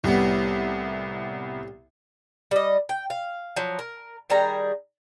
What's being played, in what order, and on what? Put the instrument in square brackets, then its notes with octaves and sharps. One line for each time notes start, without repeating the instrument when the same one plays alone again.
[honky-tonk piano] C2 B3 [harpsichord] A2 G3
[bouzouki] G3 D#5
G5
F5
F3 F#3
A#4
D#3 G3 G#4 A#5